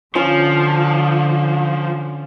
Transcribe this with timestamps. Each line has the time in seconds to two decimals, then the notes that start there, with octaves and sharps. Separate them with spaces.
0.15 D3 F3 C#4 F4